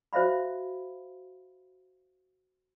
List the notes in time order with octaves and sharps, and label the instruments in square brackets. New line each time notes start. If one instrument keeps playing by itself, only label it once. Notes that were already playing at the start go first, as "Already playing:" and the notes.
[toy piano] F#4 C5 E5 F5 B5